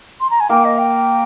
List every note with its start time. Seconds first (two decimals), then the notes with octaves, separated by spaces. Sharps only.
0.20 C6
0.30 A#5
0.40 G#5
0.49 A#3 A#4 G5
0.65 D#5
0.78 G5